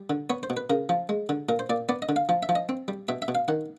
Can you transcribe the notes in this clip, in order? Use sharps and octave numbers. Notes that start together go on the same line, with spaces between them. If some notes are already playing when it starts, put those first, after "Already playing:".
Already playing: G3
D3
B3 C#5
C5
B2
B4
C#3 A#4
F3
G#3
D3
A#2 A#4
C5
A#2 D5
B3 D5
D#5
D3
F5
F3
E5
F3
D#5
C4
G3
B2 E5
E5
B2
F5
D#3 F#5